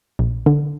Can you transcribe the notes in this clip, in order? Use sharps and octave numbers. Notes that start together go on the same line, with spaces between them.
A#1
D3